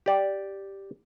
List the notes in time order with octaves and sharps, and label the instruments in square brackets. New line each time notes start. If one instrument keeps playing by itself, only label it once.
[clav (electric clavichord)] G4 D5